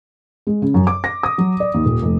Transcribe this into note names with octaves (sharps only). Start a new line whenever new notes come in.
G#3
C#3
F#2
D6
A#6
D#6
F#3
D5
D#2
D#1
F1